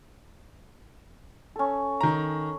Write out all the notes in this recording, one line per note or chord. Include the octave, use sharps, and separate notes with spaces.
C#4 A4
D#3 A#5